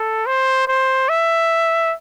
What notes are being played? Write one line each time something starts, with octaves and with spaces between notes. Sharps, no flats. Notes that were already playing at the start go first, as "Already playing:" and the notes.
Already playing: A4
C5
C5
E5